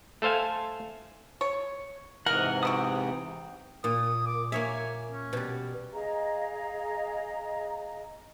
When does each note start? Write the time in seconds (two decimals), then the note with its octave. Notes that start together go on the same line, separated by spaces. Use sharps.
0.22 A3 A4 C5 F5 G#5
1.41 C#5
2.26 G#2 C3 E3 A#4 D#5 F#5
2.63 B3 E4 F#4 G5 D#6
3.84 A#2 D#6
4.26 D6
4.52 A#3 C#5 E5 G#5
5.11 C#4
5.33 B2 G3
5.92 G#4 D#5 F5 A#5